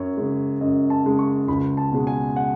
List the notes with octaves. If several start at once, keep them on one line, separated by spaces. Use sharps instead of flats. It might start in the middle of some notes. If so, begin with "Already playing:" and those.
Already playing: F#2 C#5
C#3 G#3
F#2 D#5
A5
C#3 G#3
C#6
C#2 B5
A5
B2 G#3
G#5
F#5